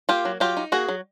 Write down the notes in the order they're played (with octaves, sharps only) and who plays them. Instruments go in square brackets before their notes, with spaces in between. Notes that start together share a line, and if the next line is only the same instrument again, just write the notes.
[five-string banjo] A#3 F4 G4
F#3
F#3 F4 G4
D#4
A#3 F#4 G#4
F#3